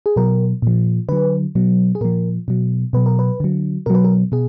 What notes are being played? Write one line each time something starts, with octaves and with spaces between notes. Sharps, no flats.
G#4
B2 F#3 A#4
A#2 F3
D3 F#3 B4
B2 F#3
G#4
A#2 F3 A#4
B2 F#3
B2 F#3 B4
A#4
B4
D3 F#3
B2 F#3 A#4
B4
A#4
B2 G#4